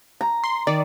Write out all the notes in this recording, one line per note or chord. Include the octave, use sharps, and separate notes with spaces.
A#5
C6
D#3 D5